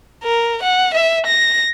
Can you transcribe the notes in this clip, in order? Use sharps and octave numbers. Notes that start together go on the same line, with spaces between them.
A#4
F#5
E5
A#6